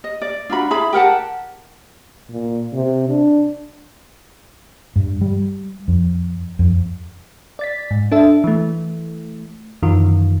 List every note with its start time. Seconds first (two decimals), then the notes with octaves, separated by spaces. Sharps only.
0.04 D#5
0.22 D5
0.49 D4 F4 F#4 B5
0.70 E4 G#4 B5
0.93 G4 A#4 F#5 A5
2.30 A#2
2.73 C3
3.09 D4
4.96 G2
5.21 G3
5.88 F2
6.59 F2
7.59 D5 A6 B6
7.91 G#2
8.12 D4 A4 E5
8.44 E3 A3
9.82 F#2 D#3 E3 F4